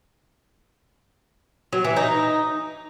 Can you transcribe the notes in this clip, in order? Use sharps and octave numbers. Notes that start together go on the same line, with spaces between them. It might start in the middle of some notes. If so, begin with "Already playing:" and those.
F#3
E3
D#4